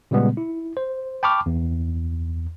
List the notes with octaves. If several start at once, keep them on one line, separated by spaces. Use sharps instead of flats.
A#2 C#3 G3 G#3 B3
E4
C5
G5 A5 B5 C#6 D6 F6
E2